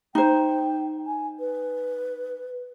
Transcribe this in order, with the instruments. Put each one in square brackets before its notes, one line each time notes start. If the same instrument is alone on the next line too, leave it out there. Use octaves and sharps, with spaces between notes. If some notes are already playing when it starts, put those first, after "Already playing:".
[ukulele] D#4 C5 [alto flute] G5
[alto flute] G#5
B4